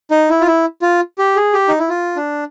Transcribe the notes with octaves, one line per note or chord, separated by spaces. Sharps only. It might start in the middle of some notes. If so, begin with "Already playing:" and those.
D#4
E4
F4
E4
F4
G4
G#4
G4
D#4
E4
F4
D4